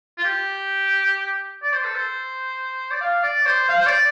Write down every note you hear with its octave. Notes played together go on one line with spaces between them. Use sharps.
F4
G4
D5
C5
A4
C5
D5
F5
D5
C5
F5
C5
D5